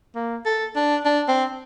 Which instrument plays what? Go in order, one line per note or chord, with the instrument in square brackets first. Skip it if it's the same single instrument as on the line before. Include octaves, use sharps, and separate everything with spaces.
[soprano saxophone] A#3
A4
D4
D4
C4